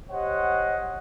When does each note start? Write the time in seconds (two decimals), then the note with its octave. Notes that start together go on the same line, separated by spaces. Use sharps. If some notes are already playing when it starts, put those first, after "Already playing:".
0.11 G4 C5 C#5 D#5 F#5